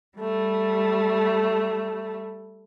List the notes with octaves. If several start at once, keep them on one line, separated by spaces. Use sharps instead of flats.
G3 A3